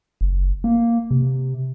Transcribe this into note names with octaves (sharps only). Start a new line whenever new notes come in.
F#1
A#3
C3